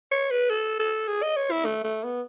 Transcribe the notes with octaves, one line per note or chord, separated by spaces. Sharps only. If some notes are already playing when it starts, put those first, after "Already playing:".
C#5
B4
A4
A4
G#4
D#5
C#5
E4
A3
A3
B3